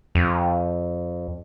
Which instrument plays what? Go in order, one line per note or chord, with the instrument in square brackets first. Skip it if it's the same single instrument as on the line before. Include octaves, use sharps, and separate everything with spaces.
[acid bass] F2